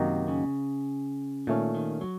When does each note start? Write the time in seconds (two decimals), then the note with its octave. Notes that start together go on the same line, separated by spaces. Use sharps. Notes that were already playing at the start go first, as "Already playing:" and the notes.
Already playing: F#2 C3 D#3 A#3 D#4 F#4
0.28 C#3
1.47 A#2 D#3 A3 C#4
1.75 D#3
2.01 F#3